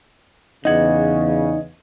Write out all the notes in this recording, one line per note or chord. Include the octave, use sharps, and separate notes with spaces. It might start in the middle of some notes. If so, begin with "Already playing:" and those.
E2 C#3 D#4 D#5 F#5 G#6